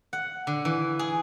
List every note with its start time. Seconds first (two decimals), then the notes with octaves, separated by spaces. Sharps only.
0.13 F#5
0.47 D3
0.65 E3
0.99 G#4